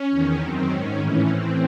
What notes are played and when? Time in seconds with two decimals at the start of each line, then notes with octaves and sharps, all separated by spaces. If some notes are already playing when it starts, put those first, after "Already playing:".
Already playing: C#4
0.10 E2 D#3
0.40 F#2 D#3 C4
0.69 G#2 D#3 C#4
0.99 A2 E3 C#4
1.28 A2 E3 C4